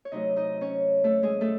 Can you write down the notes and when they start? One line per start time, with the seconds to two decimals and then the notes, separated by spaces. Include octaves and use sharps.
0.05 C#5
0.12 C3 F#3 A3 D#4 D#5
0.36 D#4 D#5
0.61 C#4 C#5
1.04 A3 A4
1.23 G#3 G#4
1.41 A3 A4